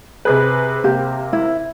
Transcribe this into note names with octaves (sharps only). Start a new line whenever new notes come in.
C3 G#4 B4
C3 A#3 G4
E4